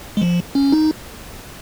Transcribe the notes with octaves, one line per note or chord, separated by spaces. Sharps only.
G#3
F3
C#4
D#4